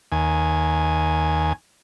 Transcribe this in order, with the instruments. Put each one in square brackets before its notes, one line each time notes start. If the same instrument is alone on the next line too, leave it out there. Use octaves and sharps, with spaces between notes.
[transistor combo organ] D#2 G#5